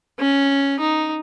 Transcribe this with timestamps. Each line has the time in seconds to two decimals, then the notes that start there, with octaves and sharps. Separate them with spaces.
0.19 C#4
0.80 D#4